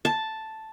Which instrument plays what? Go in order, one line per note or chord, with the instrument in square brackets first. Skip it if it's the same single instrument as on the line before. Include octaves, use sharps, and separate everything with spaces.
[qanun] A5